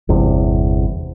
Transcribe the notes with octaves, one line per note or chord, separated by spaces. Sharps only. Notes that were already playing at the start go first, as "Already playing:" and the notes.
G1 E2 C3